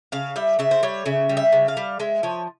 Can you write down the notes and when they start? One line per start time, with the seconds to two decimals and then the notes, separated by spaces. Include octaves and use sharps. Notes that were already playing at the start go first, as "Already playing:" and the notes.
0.12 C#3 F5
0.36 G3 E5
0.59 C#3 E5
0.71 C5
0.83 G3 C#5
1.06 C#3 E5
1.29 G3
1.37 E5
1.52 C#3
1.68 F5
1.77 G3
2.00 G#3 E5
2.23 F3 C#5